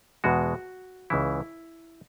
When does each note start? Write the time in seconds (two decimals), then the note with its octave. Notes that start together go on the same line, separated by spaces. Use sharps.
0.24 E2 B2 G#3 F#4
1.10 C#2 C#3 E3 E4